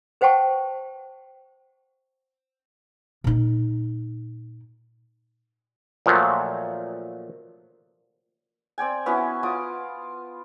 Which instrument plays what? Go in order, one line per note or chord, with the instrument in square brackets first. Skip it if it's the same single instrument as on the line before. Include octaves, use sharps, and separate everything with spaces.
[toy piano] B4 C5 F#5 G5 A5 C#6
[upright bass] A#2 D#4
[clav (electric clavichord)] A#2 F3 F#3 A3
[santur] C4 D5 G5 G#5
B3 C#4 E4 F#4
F4 D6 D#6